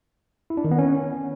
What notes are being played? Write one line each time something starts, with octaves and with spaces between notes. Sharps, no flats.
E4
D4
D#3
B3
C#4